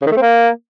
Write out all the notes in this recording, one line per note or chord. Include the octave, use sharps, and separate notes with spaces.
C#3
D#3
A3
C4
A#3